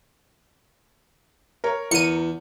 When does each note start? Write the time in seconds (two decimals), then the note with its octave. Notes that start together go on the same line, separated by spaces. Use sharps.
1.64 A#4 C#5
1.91 E2 C#7 D#7